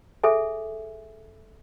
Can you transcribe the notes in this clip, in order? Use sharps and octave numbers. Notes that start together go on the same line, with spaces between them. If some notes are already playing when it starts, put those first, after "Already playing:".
G#4 A4 E5 G#5